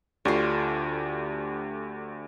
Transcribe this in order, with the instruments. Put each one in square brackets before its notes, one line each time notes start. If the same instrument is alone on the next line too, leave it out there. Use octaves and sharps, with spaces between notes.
[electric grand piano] D2 G4 C#6 [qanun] D3 F4